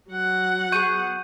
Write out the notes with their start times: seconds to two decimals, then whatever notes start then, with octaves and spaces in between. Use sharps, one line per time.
0.11 F#3 F#5
0.72 B3 G#4 C#6 G6 D#7